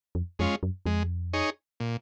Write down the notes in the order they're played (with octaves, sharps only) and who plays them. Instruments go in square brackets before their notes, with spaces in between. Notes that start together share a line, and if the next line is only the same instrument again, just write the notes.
[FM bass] F2
[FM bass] F2 [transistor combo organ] G#3 C#4 F4
[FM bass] F#2
[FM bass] F2 [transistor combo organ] G#3
[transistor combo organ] D#4 G#4 C#5
A#2